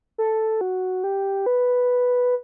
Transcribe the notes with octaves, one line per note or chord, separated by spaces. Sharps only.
A4
F#4
G4
B4